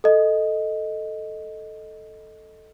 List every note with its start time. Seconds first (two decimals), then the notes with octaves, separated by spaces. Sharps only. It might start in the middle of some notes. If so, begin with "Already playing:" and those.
0.04 A4 D#5